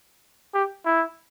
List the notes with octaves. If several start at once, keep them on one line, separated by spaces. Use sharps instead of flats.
G4
E4